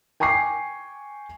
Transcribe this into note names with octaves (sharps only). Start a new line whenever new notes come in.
G5 G#5 C#6 D6 C7